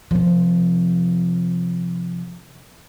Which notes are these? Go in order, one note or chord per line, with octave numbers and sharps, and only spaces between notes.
C3 F3